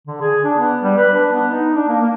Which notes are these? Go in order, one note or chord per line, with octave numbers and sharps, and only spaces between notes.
D3
G#4
D4
B3
G3
B4
D4
B3
D#4
D4
A#3
A#3